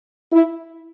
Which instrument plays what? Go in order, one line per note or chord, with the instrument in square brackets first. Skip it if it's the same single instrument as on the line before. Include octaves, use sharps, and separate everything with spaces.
[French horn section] E4